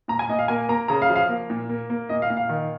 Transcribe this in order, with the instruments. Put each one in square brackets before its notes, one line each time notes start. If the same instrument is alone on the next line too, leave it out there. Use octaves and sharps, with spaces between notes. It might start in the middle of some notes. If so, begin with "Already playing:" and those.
[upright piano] A#2 A#5
G#5
A#2 D#5
F5
A#3 G#5
A#3 A#5
C#3 A#5
F5
F3
F5
A#3
A#2
A#3
A#3
A#2 D#5
F5
A#2
F5
D#3